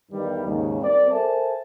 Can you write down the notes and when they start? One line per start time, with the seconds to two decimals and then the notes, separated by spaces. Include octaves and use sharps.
0.11 E2 G2 D#3 G3
0.45 D#2 G#2 C#3
0.81 G3 C4 A#4 D5
1.10 A4 A#4 C5 E5 G#5 A5